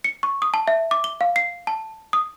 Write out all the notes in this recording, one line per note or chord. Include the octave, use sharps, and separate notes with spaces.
C#7
C#6
D#6
A5
E5
D6
G7
F5
C7
A5
D#6